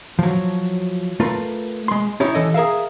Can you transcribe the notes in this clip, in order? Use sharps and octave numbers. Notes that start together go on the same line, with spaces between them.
F3 F#3
A3 F4 A#4 B4
G#3 C6
C#4 D#4 E4 G4 C#5
E3 A4 D#5
G#4 A#4 E5 F5